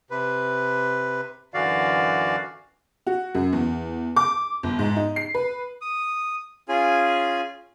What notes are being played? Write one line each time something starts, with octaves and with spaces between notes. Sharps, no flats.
C3 B4
F#2 D3 E3 F#4 D5 F5
F#4
F#2
E2
D6
G1
G#2
D#4
C7
B4
D#6
C#4 F4 G#4 G#5